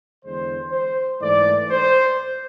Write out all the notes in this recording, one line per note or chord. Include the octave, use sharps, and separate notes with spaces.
E2 D3 G#3 C5
C5
G#2 E3 A3 D5
C5